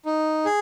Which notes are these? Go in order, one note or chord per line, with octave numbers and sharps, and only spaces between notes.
D#4
G#4